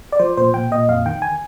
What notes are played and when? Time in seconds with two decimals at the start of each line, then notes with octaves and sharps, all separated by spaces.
0.12 D5
0.20 F3 C5
0.37 A#2 C5
0.54 A#2 G5
0.71 A#2 D#5
0.89 F2 F5
1.06 D#3 G5
1.22 G#5